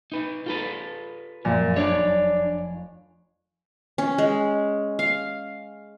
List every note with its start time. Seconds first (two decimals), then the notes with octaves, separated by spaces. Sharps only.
0.12 D#4 B4
0.46 F4 A4 B4
1.45 F#2 A#2 F3
1.76 F1 D4 C#5 D5
3.98 C#4
4.18 G#3
4.99 F5